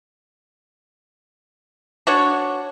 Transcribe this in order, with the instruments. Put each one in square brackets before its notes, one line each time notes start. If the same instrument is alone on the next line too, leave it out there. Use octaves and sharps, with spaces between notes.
[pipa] D4 F#4 C#5